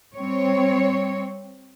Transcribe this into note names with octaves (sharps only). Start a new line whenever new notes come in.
G3 C4 C#5